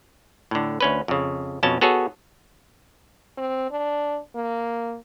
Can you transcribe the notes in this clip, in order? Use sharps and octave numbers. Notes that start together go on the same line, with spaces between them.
A2 D3
D2 C#4 B4
F2 C#3
F2 B2 C#4 A5
B3 F#4 G#4 A4 C#5
C4
D4
A#3